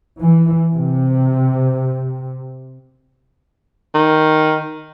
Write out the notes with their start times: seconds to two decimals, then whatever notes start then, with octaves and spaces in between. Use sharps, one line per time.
0.19 E3
0.74 C3
3.94 D#3